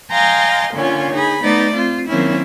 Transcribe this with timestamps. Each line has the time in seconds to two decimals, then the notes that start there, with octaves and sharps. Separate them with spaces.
0.12 D#5 F5 G5 G#5 A#5 C6
0.74 A#2 D3 C#4 F4 C#5
1.14 D#4 G#4 B5
1.44 A3 B3 D#4 D5
1.73 C4 F4
2.08 D#3 F#3 A#3 C4 C#4 E4